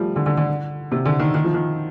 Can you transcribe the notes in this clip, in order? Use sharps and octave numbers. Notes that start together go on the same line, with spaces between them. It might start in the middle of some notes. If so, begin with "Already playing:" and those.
Already playing: F3 G3 A3
D3
D3
D3
C3
D3
D#3
D#3
F3
D#3